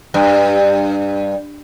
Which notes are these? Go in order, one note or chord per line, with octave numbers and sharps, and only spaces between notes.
G2